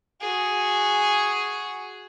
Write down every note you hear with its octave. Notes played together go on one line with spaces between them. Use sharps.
F#4 G#4